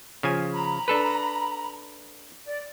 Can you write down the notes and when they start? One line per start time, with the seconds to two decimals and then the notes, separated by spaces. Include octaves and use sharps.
0.23 C#3 F3 G#5
0.53 A#5 B5
0.88 D4 A4 B4
2.48 D5